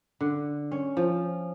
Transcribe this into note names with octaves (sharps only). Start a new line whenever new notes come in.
D3
C#4
F3